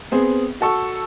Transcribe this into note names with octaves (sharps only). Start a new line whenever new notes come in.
B3 C4 G#4
F#4 A4 C#6